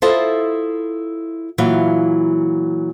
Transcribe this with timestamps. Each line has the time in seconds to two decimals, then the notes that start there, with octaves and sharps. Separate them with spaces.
0.02 E4 F4 A4 C5 D#5
1.58 A#2 E3 F#3 E4 F5